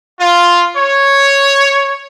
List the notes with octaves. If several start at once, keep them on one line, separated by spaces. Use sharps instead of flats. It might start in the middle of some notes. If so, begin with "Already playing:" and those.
F4
C#5